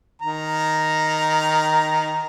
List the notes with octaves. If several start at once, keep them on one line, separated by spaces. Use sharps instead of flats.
D#3 A#5